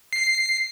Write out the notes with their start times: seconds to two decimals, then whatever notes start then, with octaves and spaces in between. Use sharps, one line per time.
0.13 C7